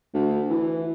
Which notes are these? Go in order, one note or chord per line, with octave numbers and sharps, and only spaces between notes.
D2
E3